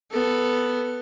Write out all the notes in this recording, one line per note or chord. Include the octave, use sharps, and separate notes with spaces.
B3 A4